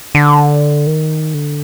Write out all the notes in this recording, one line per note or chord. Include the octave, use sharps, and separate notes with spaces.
D3
D#3
D3